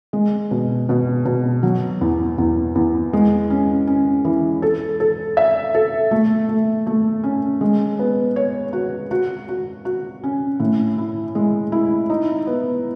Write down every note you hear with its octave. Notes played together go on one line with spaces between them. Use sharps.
G#3
B2
B2
B2
F#3
E2
E2
E2
G#3
C#4
C#4
E3
A4
A4
E5
A4
A3
A3
A3
C#4
G#3
B3
C#5
F#4
F#4
F#4
F#4
C#4
A2
E4
G#3
E4
D#4
B3